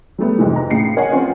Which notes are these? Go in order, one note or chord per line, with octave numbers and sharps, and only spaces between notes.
F#3 G3 A3 B3
F2 G#2 C3 E3
A#5
A2 C#3 C7 C#7
A#4 C#5 D#5 F#5 G#5
F3 C4 C#4 F4 B4